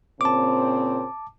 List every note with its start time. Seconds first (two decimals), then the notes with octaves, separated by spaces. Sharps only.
0.21 A#2 C#3 C4 A5 D6